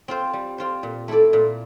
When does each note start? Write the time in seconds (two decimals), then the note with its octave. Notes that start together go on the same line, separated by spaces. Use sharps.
0.08 C4 F4 C5
0.33 G3
0.58 C4 F4 C5
0.83 A#2
1.08 A3 E4 A4 D5
1.33 A#2